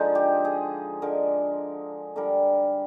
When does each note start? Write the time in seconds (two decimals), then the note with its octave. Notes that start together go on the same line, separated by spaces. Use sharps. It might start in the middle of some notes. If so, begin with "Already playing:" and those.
Already playing: D3 F3 G#3 D#4
0.15 G4
0.45 G#4
1.02 D3 G#3 A#4
2.16 D3 G3 A#4